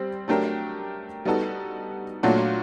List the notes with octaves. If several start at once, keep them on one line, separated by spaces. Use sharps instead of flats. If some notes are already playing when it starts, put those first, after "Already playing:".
Already playing: G3 C4
F#3 A3 D4 G4 A#4
G3 B3 D#4 F#4 A4
A#2 F#3 A3 D4 F#4